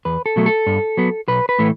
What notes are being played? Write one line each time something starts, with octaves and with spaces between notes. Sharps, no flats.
E2 B4
A4
B2 F#3 A3
A4
G2
F#3 B3
B1 B4
B4
A2 E3 A3